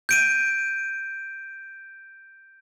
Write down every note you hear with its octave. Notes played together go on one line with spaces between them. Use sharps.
G6 D7 D#7